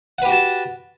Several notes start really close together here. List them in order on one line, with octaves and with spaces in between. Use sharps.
F#5 B4 G4 F#4 A5